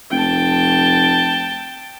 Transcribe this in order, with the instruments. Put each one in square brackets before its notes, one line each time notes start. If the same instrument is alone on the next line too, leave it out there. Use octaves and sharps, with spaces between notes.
[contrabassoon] F1 [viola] G5 A5